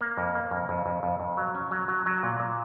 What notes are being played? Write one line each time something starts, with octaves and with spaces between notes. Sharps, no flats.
A#3
F2
A#3
F2
F2
F2
F2
F2
F#3
C#4
F#3
F#3
F#3
A#2
A#2